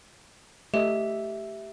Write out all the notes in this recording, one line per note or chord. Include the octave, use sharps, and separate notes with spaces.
A3 G4 D#5 E5